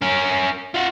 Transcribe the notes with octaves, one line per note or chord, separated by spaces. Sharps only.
C#4 A#4
F4 F#5